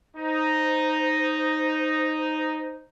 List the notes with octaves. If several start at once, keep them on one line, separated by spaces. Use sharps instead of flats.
D#4 C5